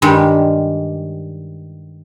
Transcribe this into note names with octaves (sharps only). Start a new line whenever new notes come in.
G2 D#3 G3 G#3